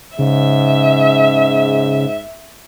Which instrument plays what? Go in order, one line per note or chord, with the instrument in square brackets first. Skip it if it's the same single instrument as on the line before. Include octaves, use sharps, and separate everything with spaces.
[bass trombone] G#2 [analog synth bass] C#3 [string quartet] E5